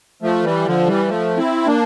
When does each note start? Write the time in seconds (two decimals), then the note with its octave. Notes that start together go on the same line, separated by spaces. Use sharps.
0.22 F3 A3
0.44 E3 G3
0.66 D3 F3
0.87 E3 G3
1.08 F3 A3
1.37 C4 E4
1.67 A#3 D4